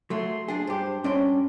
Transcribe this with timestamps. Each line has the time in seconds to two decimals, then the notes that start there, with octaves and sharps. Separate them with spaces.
0.10 F#3 A3 C6
0.48 D4 G#4
0.67 G2 G4 C5
1.04 G2 C#4 D5 C6